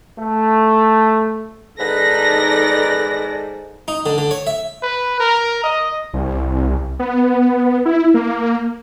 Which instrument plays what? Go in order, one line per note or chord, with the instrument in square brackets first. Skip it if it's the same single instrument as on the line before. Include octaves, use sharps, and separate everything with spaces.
[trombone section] A3
[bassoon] G#2 [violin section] D#4 A#6 [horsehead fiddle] A4 D5 [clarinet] B4
[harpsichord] D#4
D3
D3
C#5
E5
[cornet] B4
A#4
D#5
[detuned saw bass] C2
B3
E4
A#3